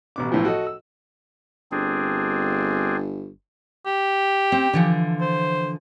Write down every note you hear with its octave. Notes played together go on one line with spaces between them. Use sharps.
A1 B2 D6
B1 A2 E3 F3
F#4 A4 D#5
E6
G1 C4 D4 G#4
G4
C4
D3 E3 F3
C5